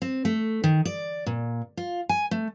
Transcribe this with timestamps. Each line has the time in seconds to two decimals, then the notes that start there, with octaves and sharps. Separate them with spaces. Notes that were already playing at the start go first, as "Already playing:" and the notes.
0.02 C4
0.25 A3
0.64 D#3
0.85 D5
1.27 A#2
1.77 F4
2.09 G#5
2.31 A3